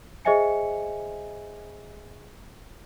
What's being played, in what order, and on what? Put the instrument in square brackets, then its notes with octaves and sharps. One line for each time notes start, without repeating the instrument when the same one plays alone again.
[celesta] G#4 C5 D#5 E5 G#5 C#7